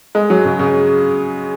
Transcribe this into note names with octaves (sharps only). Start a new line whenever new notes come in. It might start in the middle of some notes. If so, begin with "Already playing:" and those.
G#3
F#3
C#3
C#3